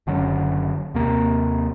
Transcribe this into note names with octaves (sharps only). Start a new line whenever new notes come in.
F#1 D3 F#3 C#4
D#2 C3 A#3